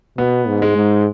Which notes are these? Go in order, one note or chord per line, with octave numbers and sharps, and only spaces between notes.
B2 B3
G#2
G#3
G#2